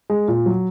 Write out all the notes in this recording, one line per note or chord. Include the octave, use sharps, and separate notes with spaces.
G#3
A#2
F#3